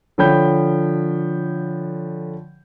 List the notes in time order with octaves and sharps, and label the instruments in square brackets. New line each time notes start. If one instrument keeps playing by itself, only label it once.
[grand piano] D3 F3 C#5 G5 B5 G6